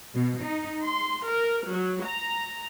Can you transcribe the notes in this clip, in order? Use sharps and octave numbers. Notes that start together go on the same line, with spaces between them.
B2
D#4
C6
A#4
F#3
A#5